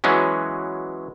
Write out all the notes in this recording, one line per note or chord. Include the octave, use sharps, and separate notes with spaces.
E3 F#3 G#3 B3 C#4